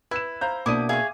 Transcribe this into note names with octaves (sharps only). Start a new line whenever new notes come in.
E4 B4 E6 E7
C5 F5 A#5 G6
B2 A#3 D4 E4 D6 D#6 D#7
G#4 C#5 E5 F5